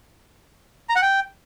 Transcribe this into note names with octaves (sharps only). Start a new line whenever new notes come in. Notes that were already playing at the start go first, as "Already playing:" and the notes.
A#5
F#5
G5